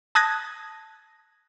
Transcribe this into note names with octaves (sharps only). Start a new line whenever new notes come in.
A5 D#6 F#6 G#6 A#6